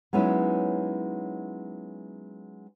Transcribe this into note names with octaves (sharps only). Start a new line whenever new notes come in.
F#3 G#3 B3 C#4 D#4 E4